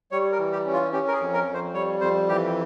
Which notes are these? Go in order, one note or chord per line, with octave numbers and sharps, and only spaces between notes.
G3 C#5
A#4
E3
G4
C#4
F4
C#4 G4
A#4
G#4
F2
A#4
F2
C5
G3 C#5
F2 C5
E3 G4